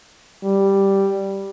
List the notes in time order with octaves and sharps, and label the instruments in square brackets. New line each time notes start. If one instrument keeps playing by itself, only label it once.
[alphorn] G3